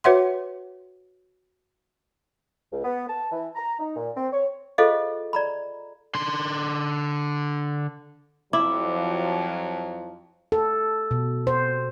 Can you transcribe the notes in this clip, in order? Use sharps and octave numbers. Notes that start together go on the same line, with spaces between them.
F#4 B4 C#5 E5 F#5 C6
C#2
B3
A5
E3
A#5
D#4
A#2
C4
C#5
F4 G#4 A4 C5 D#5 F5
D5 A#5 B5
D3 C6
F2 F3 F#3 E4 D6
A4
B2
C5